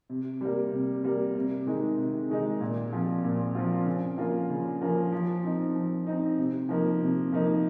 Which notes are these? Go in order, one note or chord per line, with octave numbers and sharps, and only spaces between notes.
C3
G3 A#3
C3
G3 A#3
C3
D#3 G#3 D#4
C3
D#3 G#3 D#4
A#2
F3 C4 F4
A#2
F3 C4 F4
C#3
F3 A#3 C#4 F4
C#3
F3 A#3 C#4 F4
F3
C4 D#4
F3
C4 D#4
C3
F3 A#3 D#4
C3
F3 A#3 D#4